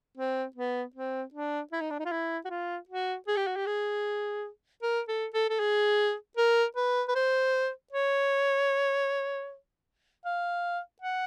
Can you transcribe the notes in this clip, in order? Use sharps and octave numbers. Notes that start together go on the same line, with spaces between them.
C4
B3
C4
D4
E4
D#4
D4
D#4
F4
E4
F#4
F4
F#4
G#4
G4
F#4
G4
G#4
A#4
A4
A4
A4
G#4
A#4
B4
B4
C5
C#5
F5
F#5